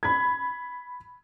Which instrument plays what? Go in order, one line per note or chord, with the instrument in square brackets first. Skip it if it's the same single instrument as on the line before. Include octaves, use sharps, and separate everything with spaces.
[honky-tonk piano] B5 G#6